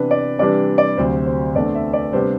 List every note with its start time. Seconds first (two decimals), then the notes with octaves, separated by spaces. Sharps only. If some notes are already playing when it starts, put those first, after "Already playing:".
Already playing: C3 E3 B3 D4 B4
0.11 D5
0.39 C3 E3 G3 D4 D5
0.78 D5
0.97 D2 C3 F#3 C5
1.26 C5
1.55 E2 D3 A3 C4 D5
1.75 E5
1.93 D5
2.13 C3 G3 B3 D4 C5